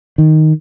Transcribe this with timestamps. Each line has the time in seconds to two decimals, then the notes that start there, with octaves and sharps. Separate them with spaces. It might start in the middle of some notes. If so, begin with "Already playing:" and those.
0.18 D#3